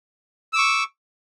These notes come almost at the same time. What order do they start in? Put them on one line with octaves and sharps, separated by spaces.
E6 D6 C#6